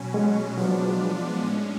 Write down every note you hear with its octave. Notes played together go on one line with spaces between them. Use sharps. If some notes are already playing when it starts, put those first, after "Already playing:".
Already playing: B2 F#3 C#4
G#3
F3 F#3 G#3 B3 D4
A2 G#3 C#4